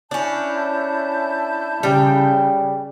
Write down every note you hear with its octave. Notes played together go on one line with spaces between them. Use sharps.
C#4 D4 E4 A5 G6
C#3 G3 G5